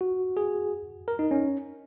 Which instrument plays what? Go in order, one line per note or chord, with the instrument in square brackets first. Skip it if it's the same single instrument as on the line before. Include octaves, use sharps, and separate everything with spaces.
[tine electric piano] F#4
G#4
A#4
D#4
C#4